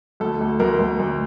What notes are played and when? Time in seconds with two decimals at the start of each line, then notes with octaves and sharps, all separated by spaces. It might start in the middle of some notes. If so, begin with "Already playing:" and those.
0.20 D2 A4
0.41 D2
0.60 D2 A#4
0.79 D2
0.99 D2